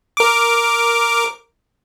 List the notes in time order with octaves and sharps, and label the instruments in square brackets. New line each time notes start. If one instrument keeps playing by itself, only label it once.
[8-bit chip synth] A#4 D6